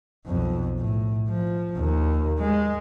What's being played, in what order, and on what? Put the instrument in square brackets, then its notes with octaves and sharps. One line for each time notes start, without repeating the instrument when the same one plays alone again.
[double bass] B1 F2
A2
F3
D#2
G#3